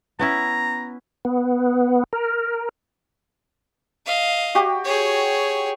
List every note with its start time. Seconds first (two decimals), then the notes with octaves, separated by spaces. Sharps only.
0.19 B3 C#4 E4 A#5
1.25 B3
2.13 A#4
4.06 D#5 F5
4.55 F#4 G4
4.84 G#4 C#5